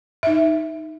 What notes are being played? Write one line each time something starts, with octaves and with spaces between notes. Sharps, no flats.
D#4 E5